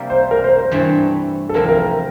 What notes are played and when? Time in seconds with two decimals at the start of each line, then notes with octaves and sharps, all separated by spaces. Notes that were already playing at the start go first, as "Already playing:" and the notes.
Already playing: C3 G3 A#3 D4
0.10 C5
0.31 A#4
0.44 C5
0.59 C5
0.71 G2 E3 A3 C4
1.49 A4
1.54 E2 C3 F3 C4 E4 A#4
1.69 A#4